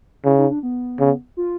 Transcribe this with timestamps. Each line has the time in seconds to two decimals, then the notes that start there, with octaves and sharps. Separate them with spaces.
0.25 C#3 E4
0.37 D#4
0.50 D4
0.63 B3
1.00 C#3
1.37 F4